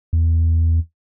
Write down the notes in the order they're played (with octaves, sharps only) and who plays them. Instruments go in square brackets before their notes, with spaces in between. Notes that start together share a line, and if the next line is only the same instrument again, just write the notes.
[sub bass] E2